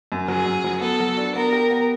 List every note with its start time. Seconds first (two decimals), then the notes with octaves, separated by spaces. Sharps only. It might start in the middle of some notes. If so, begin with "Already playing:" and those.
0.12 F#2
0.28 F#3 G#4
0.46 F#2
0.64 F#3
0.81 B3 A4
1.00 F#3
1.17 D4
1.36 B3 A#4
1.52 G4
1.70 B3